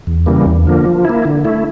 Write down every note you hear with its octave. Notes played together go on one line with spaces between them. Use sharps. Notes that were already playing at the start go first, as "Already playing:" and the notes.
E2
C#3 E3 G3 A#3
E2
D3 F3 A#3
F3
A#3 E4
D3
A3 E4